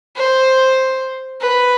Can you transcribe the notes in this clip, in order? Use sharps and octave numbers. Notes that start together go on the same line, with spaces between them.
C5
B4